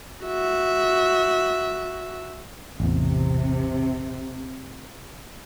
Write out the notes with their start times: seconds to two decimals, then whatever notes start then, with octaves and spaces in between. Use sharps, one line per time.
0.24 F#4 E5
2.80 A1 E2 C3